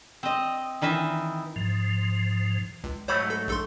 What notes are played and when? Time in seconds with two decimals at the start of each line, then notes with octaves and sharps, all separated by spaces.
0.23 C4 D#5
0.82 D#3 E3 D#5 E5
1.56 G#2 F3
2.84 C#2
3.08 G#2 F#3 A3 C5 C#5 B5
3.30 A4
3.48 A#1 A4 C6